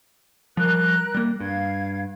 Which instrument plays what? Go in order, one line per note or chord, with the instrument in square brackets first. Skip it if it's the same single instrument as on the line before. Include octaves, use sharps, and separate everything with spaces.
[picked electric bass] F3 G3 [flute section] A#4 F#6
[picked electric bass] G3 A#3
[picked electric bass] G2 [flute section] F5 G#6